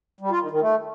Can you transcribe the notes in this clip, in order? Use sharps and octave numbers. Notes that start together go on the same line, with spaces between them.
G3
F4
D#3
D#3
A3